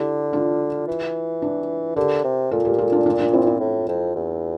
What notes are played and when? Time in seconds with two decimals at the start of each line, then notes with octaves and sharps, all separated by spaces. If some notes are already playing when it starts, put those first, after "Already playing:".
Already playing: D3 E4 G4
0.33 D4 F4
0.88 E3
1.42 D4
1.96 D3 G4 A#4
2.24 C3
2.51 A#2 F4 A4
2.65 G4 A#4
2.78 F4 A4
2.92 D4 F4
3.06 D4 F4
3.19 D4 F4
3.33 C4 E4
3.46 C4 E4
3.60 A2
3.88 F2
4.16 E2